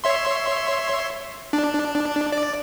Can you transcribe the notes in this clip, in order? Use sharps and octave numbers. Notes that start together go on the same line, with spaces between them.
C#5 E5 C6
D4
D5